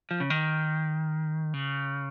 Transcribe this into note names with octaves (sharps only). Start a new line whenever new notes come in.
F3
C#3
D#3
C#3